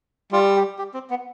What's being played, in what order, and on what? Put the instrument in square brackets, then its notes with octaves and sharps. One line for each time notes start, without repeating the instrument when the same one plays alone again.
[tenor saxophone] G3 [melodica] F4
[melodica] G4
G4
C4
B3